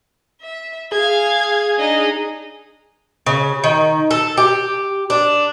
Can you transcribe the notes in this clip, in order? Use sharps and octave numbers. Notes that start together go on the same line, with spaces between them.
E5
G#4 F5 G#6
D4 D#4 D#5
C#3
D#3
A4
G4
D4